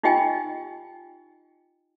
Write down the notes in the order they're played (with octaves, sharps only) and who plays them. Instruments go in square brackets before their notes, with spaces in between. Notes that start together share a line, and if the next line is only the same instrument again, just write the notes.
[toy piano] D#4 F4 G4 D#5 G5 G#5